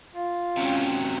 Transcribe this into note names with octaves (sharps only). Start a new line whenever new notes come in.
F4
C3 F#3 C#4 G5